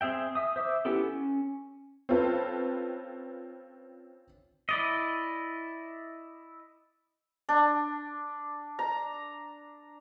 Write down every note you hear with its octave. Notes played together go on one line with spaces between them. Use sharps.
C4 G#4 E5 G5
E5 D#6
C5 E5 D6 E6
B3 C#4 E4 G4 A4
C#4
C4 C#4 F4 A4 B4
E4 D5 D#5
D4
A#5